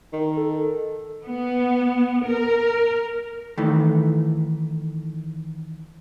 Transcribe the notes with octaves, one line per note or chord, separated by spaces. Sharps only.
D#3
A4
B3
A#4
D#3 E3 A3